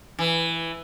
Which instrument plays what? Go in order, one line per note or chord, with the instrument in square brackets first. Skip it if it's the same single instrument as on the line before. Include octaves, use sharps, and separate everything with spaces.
[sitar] E3